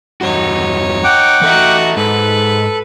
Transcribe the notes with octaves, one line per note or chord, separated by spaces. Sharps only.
E2 G2 D#4 F#4 C#5
F#5 G5 D6
E3 D#4 F#4 A4 E5
G#2 A4 B4